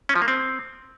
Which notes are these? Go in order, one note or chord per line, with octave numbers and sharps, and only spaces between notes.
C#4
F3
A#3
C4